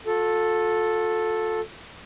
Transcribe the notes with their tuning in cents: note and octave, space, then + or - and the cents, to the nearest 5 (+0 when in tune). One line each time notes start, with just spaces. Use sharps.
F4 +45 A4 +0